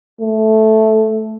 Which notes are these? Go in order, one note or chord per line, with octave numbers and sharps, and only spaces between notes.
A3